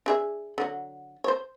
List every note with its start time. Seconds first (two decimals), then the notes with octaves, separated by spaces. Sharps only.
0.06 D4 G#4 E5
0.58 D3 F#3
1.24 C5 C#5